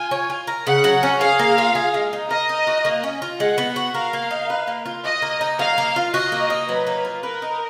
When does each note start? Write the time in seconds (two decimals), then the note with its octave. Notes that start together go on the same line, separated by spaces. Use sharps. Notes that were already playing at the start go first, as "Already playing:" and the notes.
Already playing: F4 G#5
0.11 C#5
0.30 F4
0.47 A#4
0.66 C#3 F#5
0.84 F#3
1.03 C#4
1.21 G#4 F5
1.39 A#3
1.58 F4
1.75 G#4
1.94 G#3
2.13 D#4
2.30 A#4 D#5
2.49 D#4
2.67 F#4
2.85 A#3
3.03 C#4
3.22 F4
3.40 G#3 F#5
3.58 B3
3.76 F#4
3.95 A#4 F5
4.13 A#3
4.31 D#4
4.50 B4
4.67 A#3
4.86 F4
5.05 F#4 D#5
5.22 A#3
5.41 D#4
5.59 F#3 F5
5.78 A#3
5.96 F4
6.13 F#4 D#5
6.32 A#3
6.50 D#4
6.69 F#3 B4
6.87 A#3
7.05 F4
7.23 A#4 B4
7.42 D#4